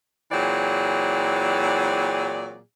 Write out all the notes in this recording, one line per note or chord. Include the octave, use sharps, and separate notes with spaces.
A#2 E3 F#3 C4 G#4 D5